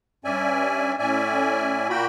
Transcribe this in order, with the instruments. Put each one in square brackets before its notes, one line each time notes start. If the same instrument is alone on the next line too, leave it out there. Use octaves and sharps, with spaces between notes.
[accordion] G2 C#4 D5 E5 G#5
A2 C#4 D5 E5 G#5
A#2 A#3 F#4 G5 B5